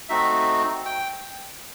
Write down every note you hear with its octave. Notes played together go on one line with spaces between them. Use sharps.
A3 C4 D#4 F#4 E5
G5